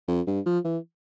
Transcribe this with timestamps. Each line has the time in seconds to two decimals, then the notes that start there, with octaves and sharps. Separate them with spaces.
0.08 F2
0.27 G2
0.46 F3
0.64 E3